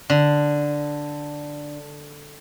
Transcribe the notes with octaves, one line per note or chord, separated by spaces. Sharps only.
D3